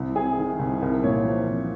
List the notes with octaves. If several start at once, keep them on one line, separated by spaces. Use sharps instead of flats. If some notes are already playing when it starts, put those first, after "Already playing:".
Already playing: C2
C3 G#4
D#3
C2
C2 A#4
A#2 C#5
F3
C2